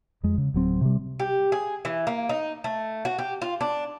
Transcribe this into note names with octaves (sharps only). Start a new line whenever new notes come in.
F2 G#3
C#3
D1 F#3 C4
C3 G3
G4
G#4
E3
A#3
D#4
A3
F#4
G4
F4
D4